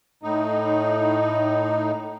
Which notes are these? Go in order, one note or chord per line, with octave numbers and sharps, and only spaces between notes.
A2 D#4